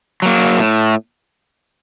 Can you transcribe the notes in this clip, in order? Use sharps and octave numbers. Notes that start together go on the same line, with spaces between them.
F#3 A#3
A2